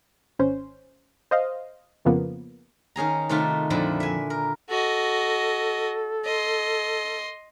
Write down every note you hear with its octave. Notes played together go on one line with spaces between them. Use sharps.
G#1 C#4 C5
C5 D#5 F5
F2 C#3 F3 A#3 B3
D#3 C#4 G#4 A#5
C3 D#3 A3 D#4 F4 F#4
F2 A#2 D3 F3 A3 E4
E5 G#5
A#4
F#4 A4 D#5
D#5 C6